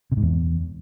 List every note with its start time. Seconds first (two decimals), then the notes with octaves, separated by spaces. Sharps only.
0.12 C3
0.17 G#2
0.22 E2